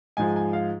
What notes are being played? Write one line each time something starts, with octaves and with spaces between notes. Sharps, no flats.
G#2 F3 G#3 G#5
G#5
F5